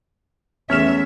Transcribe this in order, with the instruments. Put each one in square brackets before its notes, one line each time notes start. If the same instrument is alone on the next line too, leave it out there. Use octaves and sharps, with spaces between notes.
[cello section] E2 A3 E5 [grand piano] C#4 F6 E7